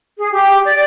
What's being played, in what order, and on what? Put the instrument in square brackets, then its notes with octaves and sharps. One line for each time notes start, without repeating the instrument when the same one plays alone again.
[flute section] G#4
G4
D5